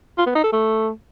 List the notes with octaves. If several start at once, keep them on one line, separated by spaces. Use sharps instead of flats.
F4
B3
D#4
A4
A3